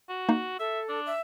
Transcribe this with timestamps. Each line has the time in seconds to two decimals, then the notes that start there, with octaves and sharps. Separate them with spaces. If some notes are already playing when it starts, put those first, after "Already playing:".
0.09 F#4
0.29 A#3 D#4
0.60 A4 E5
0.89 D4
1.06 E5